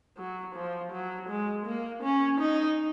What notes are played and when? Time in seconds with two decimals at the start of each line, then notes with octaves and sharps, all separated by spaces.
0.18 F#3
0.55 F3
0.92 F#3
1.29 G#3
1.66 A#3
2.03 C#4
2.40 D#4